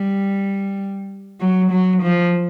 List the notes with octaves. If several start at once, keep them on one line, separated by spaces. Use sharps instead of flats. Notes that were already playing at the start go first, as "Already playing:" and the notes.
Already playing: G3
F#3
F#3
F3